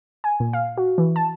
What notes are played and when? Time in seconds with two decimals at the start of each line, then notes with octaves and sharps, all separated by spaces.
0.24 G#5
0.40 A#2
0.53 F5
0.77 F#4
0.98 E3
1.16 A5